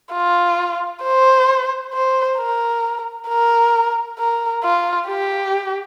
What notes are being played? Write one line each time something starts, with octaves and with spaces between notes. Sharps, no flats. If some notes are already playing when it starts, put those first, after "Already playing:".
F4
C5
C5
A#4
A#4
A#4
F4
G4